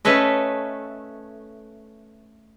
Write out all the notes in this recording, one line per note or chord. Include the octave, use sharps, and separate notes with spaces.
A3 C#4 A4 B4 D#5